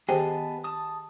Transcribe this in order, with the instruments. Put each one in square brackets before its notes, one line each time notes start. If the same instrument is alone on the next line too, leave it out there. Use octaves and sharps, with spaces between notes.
[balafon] D#3 G4 C5 [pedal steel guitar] B3 D#5 A5 [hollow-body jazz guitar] G#4 [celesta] G5
[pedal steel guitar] A5 D#6